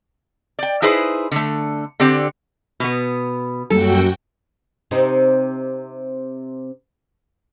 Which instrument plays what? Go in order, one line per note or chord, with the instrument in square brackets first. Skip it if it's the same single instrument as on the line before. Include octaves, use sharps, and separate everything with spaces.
[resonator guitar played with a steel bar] D5 G5
D#4 E4 G#4 B4 C5
D3 A3
D3 C4 G4 D5
B2 B3
[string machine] F#2 F#4 G5 [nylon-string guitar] G3 A#3 [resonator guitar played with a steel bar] A4
[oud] C3 C4 D#4